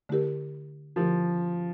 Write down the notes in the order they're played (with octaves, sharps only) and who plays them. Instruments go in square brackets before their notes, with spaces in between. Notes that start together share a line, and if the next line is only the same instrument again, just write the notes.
[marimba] D3 A3 E4 G4 A#4
[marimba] D3 A3 E4 G4 A#4 [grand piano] F3